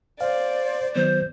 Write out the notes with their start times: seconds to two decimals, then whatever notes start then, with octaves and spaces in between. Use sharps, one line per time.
0.21 C5 D5 F5
0.96 D#3 F#3 B3 C5